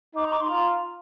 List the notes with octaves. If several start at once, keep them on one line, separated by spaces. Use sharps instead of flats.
D#4 D6
A#5
D6
C6
F4 A#5